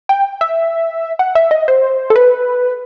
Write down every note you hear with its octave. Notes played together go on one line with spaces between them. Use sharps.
G5
E5
F#5
E5
D#5
C5
A4
B4